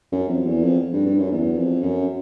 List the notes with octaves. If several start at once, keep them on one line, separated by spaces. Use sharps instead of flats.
F#2
F2
E2
F2
G2
G2
F#2
E2
F2
F#2